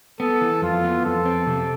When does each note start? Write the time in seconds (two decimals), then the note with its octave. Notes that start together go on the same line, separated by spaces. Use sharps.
0.20 B3 A4
0.41 E3
0.62 F2 F4
0.84 B3
1.05 F2 A4
1.26 C4
1.47 C3